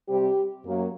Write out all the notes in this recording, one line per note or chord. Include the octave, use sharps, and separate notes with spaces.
C3 G3 C4 G4
F#2 F#3 A#3